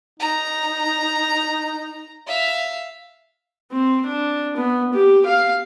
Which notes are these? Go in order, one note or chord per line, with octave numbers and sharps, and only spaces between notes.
D#4 A#5
E5 F5
C4
D4
B3
G4
F5